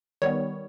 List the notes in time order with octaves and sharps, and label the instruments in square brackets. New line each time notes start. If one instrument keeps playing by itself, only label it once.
[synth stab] D#3 G3 B3 C#5